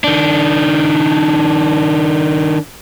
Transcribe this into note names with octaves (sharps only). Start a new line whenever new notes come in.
D#3 D4